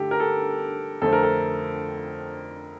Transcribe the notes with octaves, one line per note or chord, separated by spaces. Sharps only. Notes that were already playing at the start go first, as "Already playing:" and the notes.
Already playing: G2 D3 A3 G4 A4
A#4
A4
F2 D3 A3 C4 A4
A#4
A4